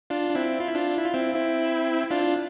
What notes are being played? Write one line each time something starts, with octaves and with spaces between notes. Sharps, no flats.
D4 F4
D4
C4 E4
F4
E4
D4 F4
E4
F4
C4 E4
C4 E4
D4 F4